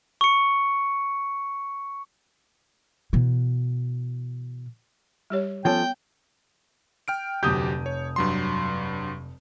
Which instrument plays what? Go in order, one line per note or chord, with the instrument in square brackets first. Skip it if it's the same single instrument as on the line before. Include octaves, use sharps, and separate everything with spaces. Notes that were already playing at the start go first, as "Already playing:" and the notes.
[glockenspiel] C#6 C#7
[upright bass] B2 E3
[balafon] G3 G4 C#5
[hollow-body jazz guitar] F3 C#4 A4 [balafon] B3 C#5 [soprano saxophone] G5
[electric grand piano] G5 F6 D7
[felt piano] F1 D#6 G6 [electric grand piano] D2 F#3 G4
[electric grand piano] C#5
G2 F#3 C6